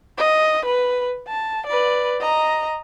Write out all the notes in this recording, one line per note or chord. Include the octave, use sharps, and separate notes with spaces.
D#5
B4
A5
B4 D5
D#5 A#5